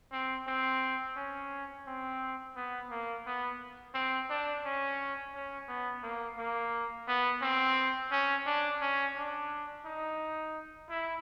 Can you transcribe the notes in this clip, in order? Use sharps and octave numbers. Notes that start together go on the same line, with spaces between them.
C4
C4
C#4
C4
B3
A#3
B3
C4
D4
C#4
C#4
B3
A#3
A#3
B3
C4
C#4
D4
C#4
D4
D#4
E4